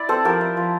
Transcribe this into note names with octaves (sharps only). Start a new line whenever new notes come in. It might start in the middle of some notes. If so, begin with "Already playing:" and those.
Already playing: E4 D5
C4 A4 C5
F3 G4 A#4
E4
F3